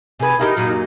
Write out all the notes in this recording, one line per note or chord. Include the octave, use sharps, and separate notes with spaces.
C3 G#4 B4 G#5
D#4 E4 F#4 G4 A#4
F#2 A#2 F#3